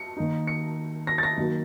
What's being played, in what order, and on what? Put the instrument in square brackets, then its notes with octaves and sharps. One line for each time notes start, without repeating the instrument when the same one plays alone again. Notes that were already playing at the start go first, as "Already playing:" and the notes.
Already playing: [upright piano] C#7
D#3 A#3 D#4
C#7
A#6
A6
A#6
D#3 F#3 A#3